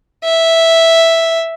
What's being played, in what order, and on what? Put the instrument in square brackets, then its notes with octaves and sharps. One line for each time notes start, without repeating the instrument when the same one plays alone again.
[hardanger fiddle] E5